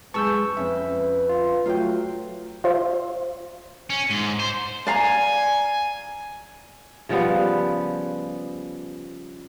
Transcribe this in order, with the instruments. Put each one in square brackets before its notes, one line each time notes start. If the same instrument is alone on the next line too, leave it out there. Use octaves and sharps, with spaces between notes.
[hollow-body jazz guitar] F#2 G#3 A5 [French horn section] B4 [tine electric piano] C#6 E6 G6
[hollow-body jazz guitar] F2 [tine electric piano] C#4 E5
[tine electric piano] F4
[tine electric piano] F#3 A3 [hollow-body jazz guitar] F4 G5
[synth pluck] F4 C5 E5
[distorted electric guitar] C#4
G#2
C5
[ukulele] D5 F5 A#5 [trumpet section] G#5
[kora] C#3 F3 G3 B3